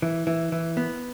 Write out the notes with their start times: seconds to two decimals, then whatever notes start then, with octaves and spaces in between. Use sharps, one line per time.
0.02 E3
0.27 E3
0.52 E3
0.77 B3